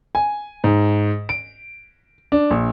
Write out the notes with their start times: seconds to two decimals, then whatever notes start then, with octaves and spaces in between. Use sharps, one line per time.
0.15 G#5
0.64 G#2
1.29 D7
2.32 D4
2.51 A#1